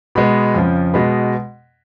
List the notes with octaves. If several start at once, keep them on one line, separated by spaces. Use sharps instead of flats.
B2 G#3 B3 B5
F2 C#3 F3
B2 G#3 B3 B5